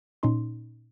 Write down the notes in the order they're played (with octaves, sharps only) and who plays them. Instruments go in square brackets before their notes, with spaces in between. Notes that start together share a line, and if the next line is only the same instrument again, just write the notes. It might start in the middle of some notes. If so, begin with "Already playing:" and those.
[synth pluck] A#2 C#4 D#4 C6